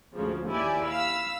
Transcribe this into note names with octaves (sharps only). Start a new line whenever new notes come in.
D2 G#2 C#3 F3
D#2 E4 G4 D5 G#5
F5 B5 E6